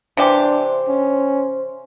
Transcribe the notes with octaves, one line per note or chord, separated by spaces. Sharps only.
C3 E3 D4 G4 C5 C6
C#4